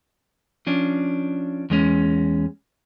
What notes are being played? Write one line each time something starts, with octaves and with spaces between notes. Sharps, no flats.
F3 C#4 D4
E2 G#3 C#4